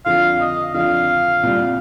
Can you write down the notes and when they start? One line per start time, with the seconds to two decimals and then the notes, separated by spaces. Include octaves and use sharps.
0.05 F2 D3 F3 F5
0.40 D#5
0.74 F2 D3 F3 F5
1.43 C2 A#2 G3